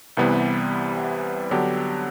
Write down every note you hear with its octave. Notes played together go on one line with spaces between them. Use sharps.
C2 C3 E3 G3 B3
D3 F#3 B3 D4 G4